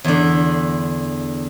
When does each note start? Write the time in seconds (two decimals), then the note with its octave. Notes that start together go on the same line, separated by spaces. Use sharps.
0.04 E2 D3